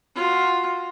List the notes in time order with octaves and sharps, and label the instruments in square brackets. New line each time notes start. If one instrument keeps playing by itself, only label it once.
[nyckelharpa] F4 F#4